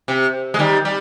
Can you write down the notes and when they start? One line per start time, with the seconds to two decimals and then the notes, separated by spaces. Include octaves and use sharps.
0.08 C3
0.54 G#3
0.59 D#3 G3
0.85 G3